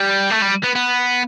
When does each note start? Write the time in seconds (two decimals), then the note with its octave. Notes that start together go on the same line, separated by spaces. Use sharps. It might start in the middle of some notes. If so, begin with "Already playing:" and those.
Already playing: G3
0.31 A3
0.42 G3
0.64 B3
0.76 B3